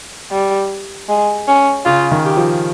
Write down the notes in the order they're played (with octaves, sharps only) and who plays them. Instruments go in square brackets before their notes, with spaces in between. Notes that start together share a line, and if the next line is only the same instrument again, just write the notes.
[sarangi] G3
G#3
C#4
[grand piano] C#3 [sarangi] F4
[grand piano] D#3
[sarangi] G4
[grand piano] F3